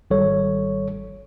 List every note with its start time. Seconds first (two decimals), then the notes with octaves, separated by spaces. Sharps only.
0.10 G#1 G3 A4 C#5